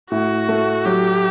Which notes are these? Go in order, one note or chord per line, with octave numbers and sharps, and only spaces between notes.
A2 F#4
A3
F#3 G4